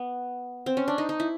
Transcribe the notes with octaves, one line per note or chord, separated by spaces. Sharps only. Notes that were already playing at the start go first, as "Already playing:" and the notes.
Already playing: B3
C4
C#4
D4
D#4
D#4
E4